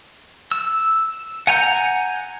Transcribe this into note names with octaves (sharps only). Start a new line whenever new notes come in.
E6
F#5 G#5 A#5 G6